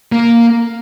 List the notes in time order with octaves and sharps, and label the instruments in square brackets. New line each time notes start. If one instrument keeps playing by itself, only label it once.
[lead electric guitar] A#3